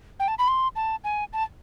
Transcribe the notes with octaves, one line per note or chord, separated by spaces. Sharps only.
G5
A5
B5
C6
A5
G#5
A5